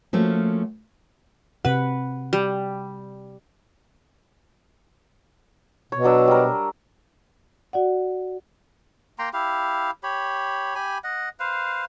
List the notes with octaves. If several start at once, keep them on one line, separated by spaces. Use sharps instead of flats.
F3 A3 A#3 C#4 F#4
C3 B4 F#5
G3
B2 C#5
F#3 D4 E6
G3 A#4
F#4 D5 F#5
A#3 G5 A#5 C6
E4 G4 F5
G4 C#5 B5
G4 G#5 B5
D#5 F#5
B4 C5 F5